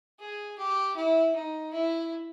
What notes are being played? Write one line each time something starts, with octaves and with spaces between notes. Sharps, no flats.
G#4
G4
E4
D#4
E4